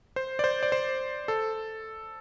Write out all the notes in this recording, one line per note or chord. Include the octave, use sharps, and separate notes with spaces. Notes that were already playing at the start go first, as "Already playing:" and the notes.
C5
D5
C5
D5
C5
A4